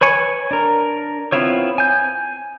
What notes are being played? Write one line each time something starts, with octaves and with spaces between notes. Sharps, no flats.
B4 C#5 G#5 C#6
D4 A#4
B3 C4 E4 F4 C#5
G#5 G6